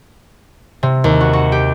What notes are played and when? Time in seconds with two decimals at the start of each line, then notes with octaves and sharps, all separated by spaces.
0.83 C3
1.04 D#2
1.21 F#4
1.33 F#4
1.52 G4